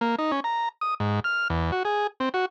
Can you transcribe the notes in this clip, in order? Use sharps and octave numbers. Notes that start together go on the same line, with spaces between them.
A#3
D#4
C#4
A#5
D#6
G#2
F6
E2
F#4
G#4
C4
F#4